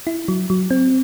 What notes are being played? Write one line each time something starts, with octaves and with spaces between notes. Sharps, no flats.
E4
F#3
F#3
C4